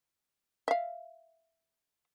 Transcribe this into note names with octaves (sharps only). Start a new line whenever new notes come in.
E5 F5